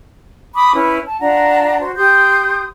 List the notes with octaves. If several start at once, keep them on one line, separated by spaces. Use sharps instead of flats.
B5 D6 D#6
C#4 E4 B4
A5
D4 F4 F#5 A#5
F#4 C5
G4 C6 D#6 G6